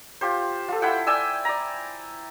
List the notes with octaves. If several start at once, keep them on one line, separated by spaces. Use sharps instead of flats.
F4 G4 C5
F4 A4
E4 F#5 G5
D5 G5 G#5 E6
D5 A#5